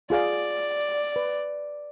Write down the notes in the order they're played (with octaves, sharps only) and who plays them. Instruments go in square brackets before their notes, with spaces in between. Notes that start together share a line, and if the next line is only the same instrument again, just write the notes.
[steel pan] F4 G#4 F5 [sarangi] D5
[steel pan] B4